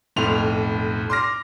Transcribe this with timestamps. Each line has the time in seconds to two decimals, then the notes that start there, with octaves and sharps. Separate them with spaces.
0.16 B1 F2 A2 C6 F7
1.10 C6 D6 F6 A#6